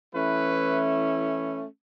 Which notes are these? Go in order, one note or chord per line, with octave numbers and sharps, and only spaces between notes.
E3 A3 C#4 E4 B4